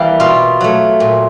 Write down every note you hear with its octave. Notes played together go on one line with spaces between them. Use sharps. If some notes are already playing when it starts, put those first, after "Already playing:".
Already playing: E3 G3 A#3 G4
B2 F4
F#3 A3
A#2